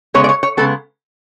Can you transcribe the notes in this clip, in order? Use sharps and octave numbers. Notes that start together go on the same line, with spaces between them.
C#3 G#3 B3 C#5
D5
C#5
C#5
C#3 G#3 B3 A4